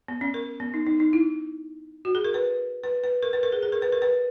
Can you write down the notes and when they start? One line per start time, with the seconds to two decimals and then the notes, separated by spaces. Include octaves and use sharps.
0.08 B3
0.21 C#4
0.34 A#4
0.60 B3
0.74 D#4
0.86 D#4
1.00 D#4
1.13 E4
2.05 F#4
2.15 G#4
2.24 A#4
2.34 B4
2.84 B4
3.04 B4
3.23 A#4
3.33 B4
3.43 A#4
3.52 G#4
3.63 G#4
3.72 A#4
3.82 B4
3.92 A#4
4.02 B4